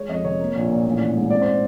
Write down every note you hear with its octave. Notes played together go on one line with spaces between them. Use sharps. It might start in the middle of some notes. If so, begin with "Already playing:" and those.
Already playing: G#3 C#5
F2 D#5
C3 C#5
A#3
A#1
A#2
A1
A1
G#2
C4 D5
C5